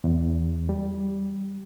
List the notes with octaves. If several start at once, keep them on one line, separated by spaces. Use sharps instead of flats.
E2
G3